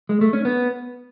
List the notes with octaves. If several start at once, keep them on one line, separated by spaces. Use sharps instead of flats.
G#3
A3
C#4
B3